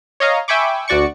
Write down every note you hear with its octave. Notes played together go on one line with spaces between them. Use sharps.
C#5 D#5 F5 A#5
E5 G5 G#5 B5 C#6 D6
D2 F#4 D5 C#6 C#7